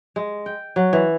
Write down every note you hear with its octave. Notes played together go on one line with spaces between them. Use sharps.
G#3
G5
F#3
E3